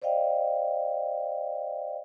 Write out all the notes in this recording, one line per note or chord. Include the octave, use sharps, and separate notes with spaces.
C5 D5 D#5 F5 G5